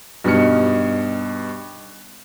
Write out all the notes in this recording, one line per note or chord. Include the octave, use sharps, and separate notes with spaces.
G2 B2 D#4 F6 C#7